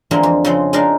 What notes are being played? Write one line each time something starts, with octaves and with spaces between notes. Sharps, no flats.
D3 E3 F3 G#3 A#3 C4
F2
C#3 F3 G#3 C4 C5
G#3 D4 D#4 A#4 F5